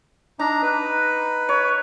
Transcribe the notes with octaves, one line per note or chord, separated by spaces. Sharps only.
D4 D#4 A#5
B4
C#5